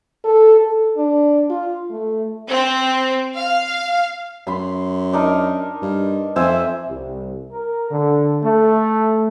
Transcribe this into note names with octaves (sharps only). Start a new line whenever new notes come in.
A4
A4
D4
F4
A3
C4
F5
F#2 B5 C6
D4 D#4 A#4
G2
F2 C5 E5 G#5
C2
A#4
D3
A3